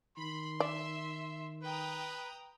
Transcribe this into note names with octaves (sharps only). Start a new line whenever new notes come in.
D#3 B5 C6
D5 E5
B4 G5 A#5 D#6